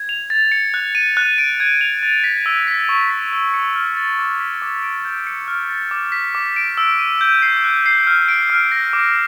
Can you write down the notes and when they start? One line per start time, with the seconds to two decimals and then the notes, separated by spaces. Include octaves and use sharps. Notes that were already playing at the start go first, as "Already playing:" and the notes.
Already playing: G#6
0.09 F7
0.30 A6
0.52 C#7
0.74 F#6
0.95 D#7
1.17 F#6
1.38 D7
1.60 G#6
1.81 F7
2.03 A6
2.24 B6
2.46 E6
2.67 B6
2.89 C#6
3.11 B6
3.33 E6
3.54 C#7
3.76 F6
3.97 A6
4.19 D6
4.40 B6
4.62 D6
4.83 D7
5.05 G6
5.27 C#7
5.48 F6
5.69 A6
5.91 D6
6.12 B6
6.35 D6
6.56 D7
6.78 E6
6.99 D#7
7.21 G6
7.42 C7
7.64 F#6
7.86 C7
8.07 F6
8.28 D7
8.50 F6
8.72 A#6
8.93 D6